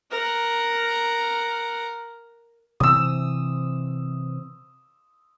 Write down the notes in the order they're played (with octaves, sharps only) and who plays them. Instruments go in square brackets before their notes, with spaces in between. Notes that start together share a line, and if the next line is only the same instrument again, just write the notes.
[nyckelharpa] A#4 F#5
[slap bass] C3 E3 C4 [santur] D#6 E6